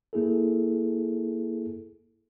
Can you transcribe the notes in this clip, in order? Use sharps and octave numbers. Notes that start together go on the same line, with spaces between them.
A#3 E4 G#4 A4